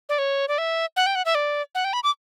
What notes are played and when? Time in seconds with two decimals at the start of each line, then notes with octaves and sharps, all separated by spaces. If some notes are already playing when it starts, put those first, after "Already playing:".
0.09 D5
0.18 C#5
0.48 D5
0.58 E5
0.96 F#5
1.06 G5
1.15 F#5
1.25 E5
1.35 D5
1.75 F#5
1.85 G5
1.93 B5
2.04 D6